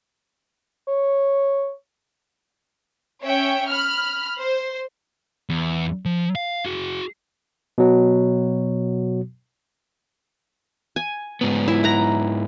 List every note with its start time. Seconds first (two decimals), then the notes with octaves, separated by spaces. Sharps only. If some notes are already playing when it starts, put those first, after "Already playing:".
0.88 C#5
3.22 C#4 C#5 E5 G5
3.69 B5 F6
4.38 C5
5.50 E2
6.05 F3
6.35 F5
6.66 F#4 G#4
7.78 B2 F#3
10.96 G#5
11.41 G#2 B3
11.68 E4
11.84 F#5 A#5